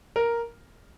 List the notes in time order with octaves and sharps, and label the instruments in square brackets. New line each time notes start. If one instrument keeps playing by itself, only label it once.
[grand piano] A#4